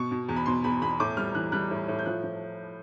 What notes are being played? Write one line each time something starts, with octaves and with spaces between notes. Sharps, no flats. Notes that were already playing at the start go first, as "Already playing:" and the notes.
Already playing: B2 C#6
B2
E2
B5
B2 C6
E2 B5
E2 B5
A2 D6
G3 F6
E3 F#6
G3 F#6
A2
A2
G6
F3 F#6
F3